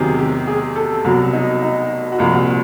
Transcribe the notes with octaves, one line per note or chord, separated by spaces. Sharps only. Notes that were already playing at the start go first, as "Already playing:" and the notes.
Already playing: E2 C3 D#3 F#3 G#4
G4
G#4
A4
C2 B2 F#3
D#4
D#4
F#4
C2 A#2 F3 F4
F#4